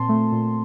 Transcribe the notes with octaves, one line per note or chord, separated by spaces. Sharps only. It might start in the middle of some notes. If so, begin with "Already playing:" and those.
Already playing: A#2 C4 A5 C6
A3
A#2